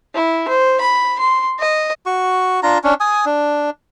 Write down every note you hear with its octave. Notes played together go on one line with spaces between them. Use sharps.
E4
C5
B5
C6
D#5
F#4 C#6
D4 F4 A#5
C#4 D4
G#5 D#6
D4